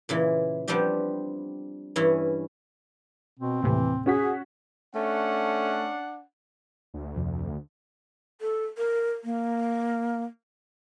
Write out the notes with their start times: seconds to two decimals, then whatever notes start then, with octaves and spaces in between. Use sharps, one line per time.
0.09 A#2 C#3 E3
0.68 F3 G3 B3 C4 D4 G4
1.96 G2 E3 C#4 E4
3.39 B2 C4
3.63 D#2 A2 C3 E3
4.06 C#4 F#4 G#4 B6
4.95 A3 C#4 D4 F#5
6.94 D2
7.16 F2 C3
8.41 A4
8.78 A#4
9.24 A#3